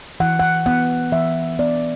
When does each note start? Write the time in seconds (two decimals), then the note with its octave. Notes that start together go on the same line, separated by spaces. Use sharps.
0.20 E3 F#5
0.39 F#5
0.66 B3 F#5
1.12 E3 E5
1.59 B3 D5